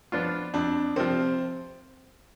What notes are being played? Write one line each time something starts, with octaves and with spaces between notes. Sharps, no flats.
F3 B3 D4 F4
F2 D4
C3 F3 C4